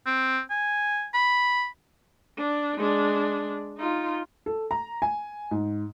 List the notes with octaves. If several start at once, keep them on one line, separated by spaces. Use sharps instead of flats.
C4
G#5
B5
D4
G#3 D4
D#4 F4
A4
A#5
G#5
G#2